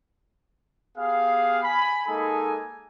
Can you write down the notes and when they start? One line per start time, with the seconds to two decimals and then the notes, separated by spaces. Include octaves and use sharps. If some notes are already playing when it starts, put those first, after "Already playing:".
0.97 B3 G4 G#4 F5
1.64 G#5 B5
2.07 G#3 A#3 D#4 G#4 A4 G#5